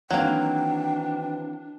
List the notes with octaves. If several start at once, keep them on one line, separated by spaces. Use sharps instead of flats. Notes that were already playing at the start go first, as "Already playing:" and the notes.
D#3 E3 F#3 A#3 C4 D4 G5